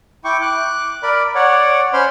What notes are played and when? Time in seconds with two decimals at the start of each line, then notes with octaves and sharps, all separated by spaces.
0.25 E4 G5 C#6 D6
0.42 D6 F#6
1.03 A#4 D5 B5
1.35 C#5 D5 F#5
1.93 C#4 C5 C#5 B5 C6 F6